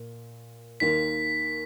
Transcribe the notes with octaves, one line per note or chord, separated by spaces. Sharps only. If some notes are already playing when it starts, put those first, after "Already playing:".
Already playing: A#2
D#2 D#3 A#3 B6